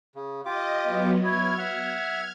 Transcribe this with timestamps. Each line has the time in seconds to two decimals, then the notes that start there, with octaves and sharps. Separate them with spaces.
0.15 C#3
0.46 F4 G4 D#5 D6
0.83 F#3 B3
1.24 E4 C#5 F6 G#6
1.58 E5 F#5